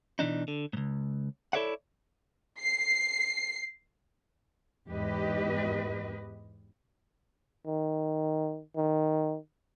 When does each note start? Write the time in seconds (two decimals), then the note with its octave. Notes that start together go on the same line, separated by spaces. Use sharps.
0.19 B2 E3 D4 D#4
0.48 D3
0.73 C#2 G#2
1.53 E4 A4 C#5 D5 E5 F#5
2.59 C7
4.89 E2 G#2 G4 B4 D#5
7.67 D#3
8.76 D#3